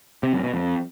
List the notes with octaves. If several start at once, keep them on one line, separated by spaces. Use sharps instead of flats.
C3
F#2
B2
F2